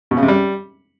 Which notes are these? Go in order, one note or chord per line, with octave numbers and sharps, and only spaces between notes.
B2
C#3
C3
G3